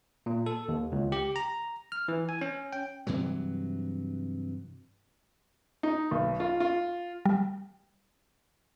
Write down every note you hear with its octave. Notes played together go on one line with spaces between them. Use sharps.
A#2
A4
D#2
C#2
G4
A#5
F6
E3
G#5
C#4
G5
G2 C3 E3 F#3
D#4
B1
F4
F4
G3